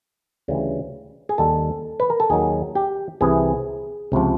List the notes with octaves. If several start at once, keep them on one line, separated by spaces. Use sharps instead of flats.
D2 C#3 E3 G3
G#4
D#2 D#3 G3 A4
B4
A#4
A4
D#2 D#3 F#3 G#4
G4
C2 C3 E3 G#4
C#2 C3 F3